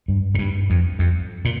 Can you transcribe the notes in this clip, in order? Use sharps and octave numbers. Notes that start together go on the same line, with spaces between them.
G2
A2
G2
F2
F2
A#2